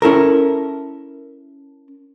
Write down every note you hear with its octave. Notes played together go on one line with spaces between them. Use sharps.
C#4 E4 A4 A#4